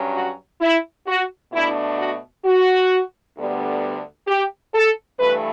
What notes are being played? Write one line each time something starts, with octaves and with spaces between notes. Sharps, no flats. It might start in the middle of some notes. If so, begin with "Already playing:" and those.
Already playing: G2 F#3 C#4
F#4
E4
F#4
B2 A3 D4 E4
F#4
F#4
D2 D3 G3 B3
G4
A4
G2 E3 A3 B4